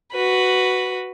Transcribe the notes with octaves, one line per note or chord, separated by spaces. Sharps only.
F#4 B4